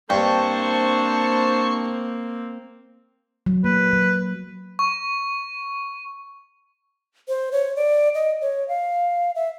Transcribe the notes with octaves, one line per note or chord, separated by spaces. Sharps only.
G2 A#3 C4 D4 C5 A5 C#6
F#3
A#3 B4
F#3
C#6
C5
C#5
D5
D#5
C#5
F5
E5